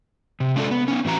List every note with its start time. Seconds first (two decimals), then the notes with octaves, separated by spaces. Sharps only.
0.40 C3
0.56 G#3 C#4 D4 F4 G4 A4
0.71 B3
0.88 B3 C#4
1.05 A2 E3 F#4 A#5